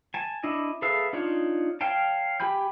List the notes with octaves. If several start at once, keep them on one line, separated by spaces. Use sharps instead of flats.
G#5 A5
D4 E4 D#5
G#4 A4 B4 E5 F5
D4 D#4 F4 C#5
C#5 F5 G5 A5
G4 G5 G#5 B5 G6